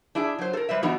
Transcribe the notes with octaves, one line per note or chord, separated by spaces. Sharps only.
D4 E4 G#4
F#3 C5
A4 A#4
G3 B4 C5 E5
E3 B3 D4 D#4 F#4